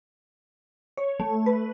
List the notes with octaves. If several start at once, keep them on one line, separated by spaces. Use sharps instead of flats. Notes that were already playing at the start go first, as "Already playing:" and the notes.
C#5
A3
B4